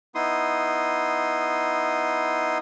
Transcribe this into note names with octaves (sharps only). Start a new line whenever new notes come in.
B3 D#4 E4 C6 D#6